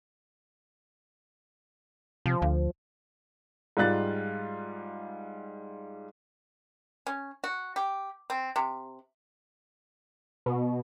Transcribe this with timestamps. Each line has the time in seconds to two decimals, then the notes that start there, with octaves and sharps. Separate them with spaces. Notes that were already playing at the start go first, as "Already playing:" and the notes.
2.26 C3 F3
2.42 D2
3.77 G#2 G3 F4 F#6 A6
7.07 C#4
7.44 F#4
7.76 G4
8.30 C4
8.56 C3
10.46 B2